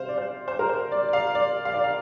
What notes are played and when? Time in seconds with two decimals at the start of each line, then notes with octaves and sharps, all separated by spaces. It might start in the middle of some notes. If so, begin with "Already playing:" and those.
Already playing: C3 C5 F5
0.09 D5
0.18 C5
0.48 C5
0.59 A#4
0.69 C5
0.92 D5
1.08 D5
1.13 F5
1.35 D5
1.65 F5
1.74 D5
1.84 F5